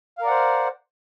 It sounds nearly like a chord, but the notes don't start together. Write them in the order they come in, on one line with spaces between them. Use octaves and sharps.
F5 A#4 D5 F#5 C5